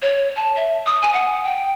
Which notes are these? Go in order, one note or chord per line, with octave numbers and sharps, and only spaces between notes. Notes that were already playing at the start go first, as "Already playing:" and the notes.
C#5
A5
E5
D#6
G#5
F#5
G5